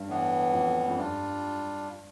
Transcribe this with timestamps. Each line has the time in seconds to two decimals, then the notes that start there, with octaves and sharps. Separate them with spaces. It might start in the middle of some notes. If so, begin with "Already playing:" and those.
Already playing: G2
0.08 A2 E3 B3
0.53 F2
0.88 F2
0.97 G2 G3 D4 F4